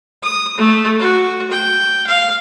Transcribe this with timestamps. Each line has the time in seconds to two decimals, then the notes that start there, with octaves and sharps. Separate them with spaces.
0.23 D#6
0.57 A3
0.99 F#4
1.51 G5
2.07 F5